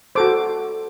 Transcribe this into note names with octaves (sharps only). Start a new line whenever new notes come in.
F#4 A4 C5 D6